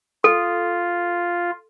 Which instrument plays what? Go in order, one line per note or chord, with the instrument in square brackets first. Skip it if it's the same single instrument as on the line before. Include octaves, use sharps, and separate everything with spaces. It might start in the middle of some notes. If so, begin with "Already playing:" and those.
[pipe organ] F4 [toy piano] A4